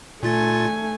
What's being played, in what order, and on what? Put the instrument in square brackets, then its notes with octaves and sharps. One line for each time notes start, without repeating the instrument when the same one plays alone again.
[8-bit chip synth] A#2 F4 A6 [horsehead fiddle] A3 G#5